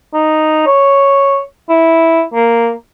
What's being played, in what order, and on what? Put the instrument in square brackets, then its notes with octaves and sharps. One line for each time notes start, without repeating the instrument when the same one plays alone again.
[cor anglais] D#4
C#5
E4
A#3